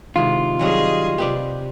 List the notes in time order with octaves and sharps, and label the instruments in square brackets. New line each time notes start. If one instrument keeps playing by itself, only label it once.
[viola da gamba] C3 [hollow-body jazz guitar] D#3 G#3 E4 [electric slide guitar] F4
[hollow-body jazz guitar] D#3 F#3 G3 [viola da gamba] G#4 D#5
[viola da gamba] C3 [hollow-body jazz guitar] G4 B4 D5